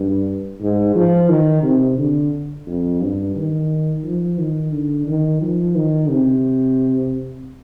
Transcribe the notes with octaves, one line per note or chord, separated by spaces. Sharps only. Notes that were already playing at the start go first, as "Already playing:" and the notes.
Already playing: G2
G#2
F3
D#3
C3
D3
F2
G2
D#3
F3
D#3
D3
D#3
F3
D#3
C3